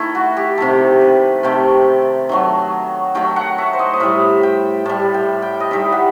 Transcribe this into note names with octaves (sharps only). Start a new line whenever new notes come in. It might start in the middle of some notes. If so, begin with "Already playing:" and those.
Already playing: D#3 A3 E4 A4
F#4
G4
C3 D#3 A3 A4
B4
C3 D#3 A3 G5
D#3 F#3 A3
D#3 F#3 A3 G5
F#5
E5
C5
D#5
D#5
A2 G3 E5
G5
A2 G3 A5
G5
G5
D#5
D#3 G3 E5
F#5